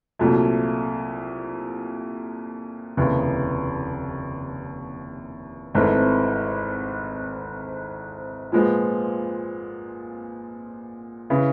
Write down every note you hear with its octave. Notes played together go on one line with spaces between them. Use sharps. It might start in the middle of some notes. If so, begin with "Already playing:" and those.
C2 A#2 F#3 A3
F1 D#2 C#3 E3
G#1 G#2 E3 A3 C4
A#2 F3 G#3 B3
C#3 E3